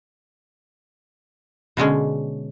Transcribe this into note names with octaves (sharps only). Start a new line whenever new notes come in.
B2 D3 G#3 C#4